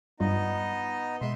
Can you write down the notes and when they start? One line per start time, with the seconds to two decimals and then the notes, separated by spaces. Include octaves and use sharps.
0.20 G2 G3 B3 D#4 F4 D#5
1.21 B2 G#3 E5 C6